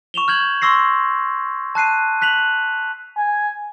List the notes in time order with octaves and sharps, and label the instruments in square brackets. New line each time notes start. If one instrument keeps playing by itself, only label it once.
[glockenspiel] C#6 E7 F7 G7
F6 G6 G#6 F#7
C6 C#6 E6 A#6 C7
A5 F#6 C7 D#7
F#6 B6 F7 F#7
[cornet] G#5